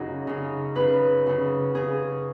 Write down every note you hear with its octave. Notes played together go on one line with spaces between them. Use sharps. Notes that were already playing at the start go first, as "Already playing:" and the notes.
Already playing: F#2 C#3 D#4 F#4 G#4
F#2 C#3
F#2 C#3 B4
F#2 C#3
F#2 C#3 G#4